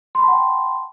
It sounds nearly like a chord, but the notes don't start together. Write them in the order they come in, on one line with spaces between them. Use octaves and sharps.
C6 B5 A5 F#5 G5